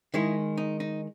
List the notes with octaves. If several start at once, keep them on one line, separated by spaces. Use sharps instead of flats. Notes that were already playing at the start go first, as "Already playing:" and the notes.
D#3 G#3 E4
D#4
D#4